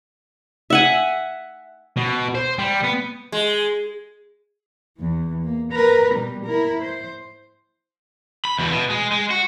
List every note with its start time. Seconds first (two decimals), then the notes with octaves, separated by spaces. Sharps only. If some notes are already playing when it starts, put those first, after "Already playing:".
0.70 E5 F#5 G#5
1.97 B2
2.35 C5
2.59 G3
2.83 B3
3.32 G#3
4.98 E2 E3
5.42 A#3
5.73 A#4 B4
6.15 B2 G3
6.46 E4 A#4
6.82 C5
8.45 B5
8.59 E2 B2
8.72 B2
8.90 G#3
9.11 G#3
9.31 F#4